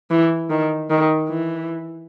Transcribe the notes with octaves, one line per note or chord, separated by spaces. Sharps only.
E3
D#3
D#3
E3